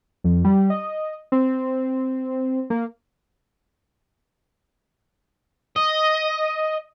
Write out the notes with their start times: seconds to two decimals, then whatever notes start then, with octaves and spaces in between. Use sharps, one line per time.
0.24 F2
0.44 G3
0.70 D#5
1.32 C4
2.70 A#3
5.76 D#5